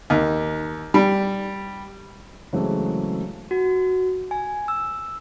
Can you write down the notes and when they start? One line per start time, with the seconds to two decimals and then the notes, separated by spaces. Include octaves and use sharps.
0.10 D#2
0.94 G3
2.53 C#3 E3 F#3 G#3 A3 C4
3.51 F#4
4.31 G#5
4.68 E6